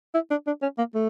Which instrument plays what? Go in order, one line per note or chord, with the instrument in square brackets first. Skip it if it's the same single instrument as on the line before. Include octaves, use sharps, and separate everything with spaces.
[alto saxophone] E4
D4
D4
C#4
A#3
A3